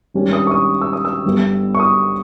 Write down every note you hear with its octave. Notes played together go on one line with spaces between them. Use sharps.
G#1 G2 G3 C#4
D#6
C#6
D#6
E6
D#6
E6
G1 G2 G3 B3
C#6
D#6